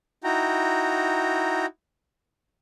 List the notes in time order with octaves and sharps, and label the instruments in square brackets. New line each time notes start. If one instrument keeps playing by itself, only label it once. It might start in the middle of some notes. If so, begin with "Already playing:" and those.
[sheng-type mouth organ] D#4 E4 F#4 G5 A#5